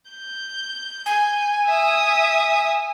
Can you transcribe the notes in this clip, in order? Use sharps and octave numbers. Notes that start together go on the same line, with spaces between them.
G6
G#5
E5 D#6